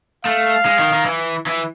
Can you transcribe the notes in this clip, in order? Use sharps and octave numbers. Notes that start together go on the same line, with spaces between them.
A3 F5
G#3
D#3
D#3
E3
E3